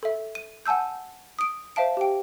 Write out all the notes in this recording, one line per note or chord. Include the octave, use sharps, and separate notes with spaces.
A4 E5
D#7
F#5 G#5 A5 E6 G6
D#6 D7
C5 E5 F5 A5 D7
G4 G5